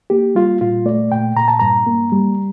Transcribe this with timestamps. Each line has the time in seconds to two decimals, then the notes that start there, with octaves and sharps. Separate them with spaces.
0.10 A#3 G4
0.35 G3 F4
0.61 A#2 F4
0.86 A3 D5
1.12 A#2 G5
1.36 A#2 A#5
1.48 A5
1.59 G2 A#5
1.86 A#3
2.12 G3